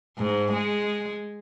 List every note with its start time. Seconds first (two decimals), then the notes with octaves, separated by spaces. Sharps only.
0.18 G#2
0.53 G#3